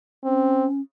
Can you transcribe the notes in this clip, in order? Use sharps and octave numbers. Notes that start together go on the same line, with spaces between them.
C4 C#4